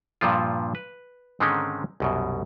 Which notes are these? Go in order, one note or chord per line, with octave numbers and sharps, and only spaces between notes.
G2 A#2 F3 F4
B4
G#2 D3 D#3 G#3 C4 C#4
C2 F#2 B2